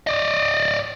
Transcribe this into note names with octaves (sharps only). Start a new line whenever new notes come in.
D5 D#5